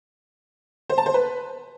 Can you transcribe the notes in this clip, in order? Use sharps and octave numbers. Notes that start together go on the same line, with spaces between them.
C5
A5
C5
B4